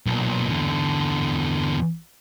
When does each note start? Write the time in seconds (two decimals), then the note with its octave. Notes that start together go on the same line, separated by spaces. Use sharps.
0.06 B1 A#2
0.49 E2 D3